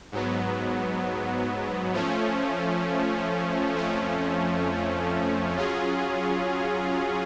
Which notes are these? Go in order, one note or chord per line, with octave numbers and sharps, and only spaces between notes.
G#2 F#3 B3
F3 A3 C#4
F2 F3 A3 C#4
F#3 C#4 F4 G#4